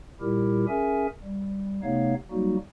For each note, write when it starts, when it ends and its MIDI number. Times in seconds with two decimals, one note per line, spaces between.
0.21 0.65 46
0.21 0.65 55
0.21 0.65 64
0.21 0.65 67
0.21 0.65 70
0.68 1.07 61
0.68 1.07 68
0.68 1.07 70
0.68 1.07 76
0.68 1.07 80
1.23 1.80 55
1.83 2.14 48
1.83 2.14 57
1.83 2.14 59
1.83 2.14 63
1.83 2.14 73
1.83 2.14 77
2.31 2.57 54
2.31 2.57 55
2.31 2.57 58
2.31 2.57 63
2.31 2.57 66